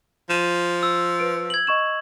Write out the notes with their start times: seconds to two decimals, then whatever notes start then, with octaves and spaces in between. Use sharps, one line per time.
0.30 F3 D#7 E7
0.83 E6
1.19 B4 D7
1.50 G#6 F#7
1.67 D#5 C#6 E7